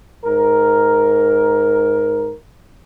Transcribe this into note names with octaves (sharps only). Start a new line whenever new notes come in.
G#2 A#4